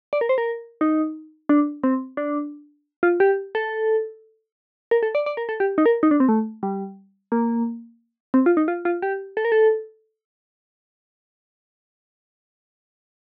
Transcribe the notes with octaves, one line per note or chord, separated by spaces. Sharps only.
D5
A#4
C5
A#4
D#4
D4
C4
D4
F4
G4
A4
A#4
A4
D5
D5
A#4
A4
G4
D#4
A#4
D#4
D4
C4
A3
G3
A#3
C4
F4
D#4
F4
F4
G4
A4
A#4
A4